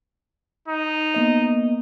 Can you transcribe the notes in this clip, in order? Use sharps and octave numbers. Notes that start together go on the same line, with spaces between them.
D#4
A#3 B3 D#5